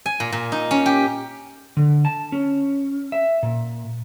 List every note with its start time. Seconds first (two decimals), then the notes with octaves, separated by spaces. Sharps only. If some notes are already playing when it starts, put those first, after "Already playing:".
0.06 G#5
0.20 A#2
0.32 A#2
0.52 D#4
0.71 C#4
0.86 G4
1.77 D3
2.05 A5
2.32 C#4
3.12 E5
3.43 A#2